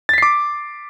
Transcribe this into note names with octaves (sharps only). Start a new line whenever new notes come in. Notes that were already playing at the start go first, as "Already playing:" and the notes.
D6 A6 B6 C7